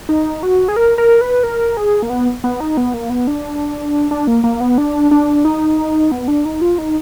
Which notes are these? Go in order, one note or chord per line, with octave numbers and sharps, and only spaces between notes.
D#4
F#4
G#4
A#4
A#4
B4
A#4
G#4
A#3
B3
B3
D#4
B3
A#3
B3
D4
D4
A#3
A#3
B3
D4
D4
D#4
B3
D4
D#4
F4
D#4